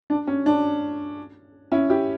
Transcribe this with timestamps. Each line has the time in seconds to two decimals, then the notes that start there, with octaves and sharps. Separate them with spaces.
0.10 D4
0.27 C#4
0.46 D4
1.72 C#4 E4
1.90 E4 G4